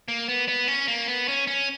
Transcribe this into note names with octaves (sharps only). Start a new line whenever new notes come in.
A#3
B3
B3
C#4
A#3
B3
C#4
C#4